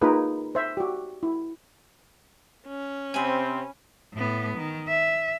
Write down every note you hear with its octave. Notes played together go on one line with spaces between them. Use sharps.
A#3 D#4 F4 G#4 A#4 B4
C5 E5
F#4 G4
E4
C#4
C3 C4 G#5 B5
A2 B3
D#3
E5